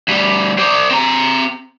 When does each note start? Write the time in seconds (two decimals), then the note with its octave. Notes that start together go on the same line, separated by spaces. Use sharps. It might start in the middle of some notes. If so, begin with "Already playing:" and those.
0.08 D2 G3
0.59 C5 D5
0.91 C4 A#5